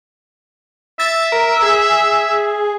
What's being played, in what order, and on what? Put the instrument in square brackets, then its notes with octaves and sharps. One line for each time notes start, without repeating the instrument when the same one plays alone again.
[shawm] E5 [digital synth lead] A6
[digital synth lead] A#4
G#4